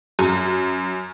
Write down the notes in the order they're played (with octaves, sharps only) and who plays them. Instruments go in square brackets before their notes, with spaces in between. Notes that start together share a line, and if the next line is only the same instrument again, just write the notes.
[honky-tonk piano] F#2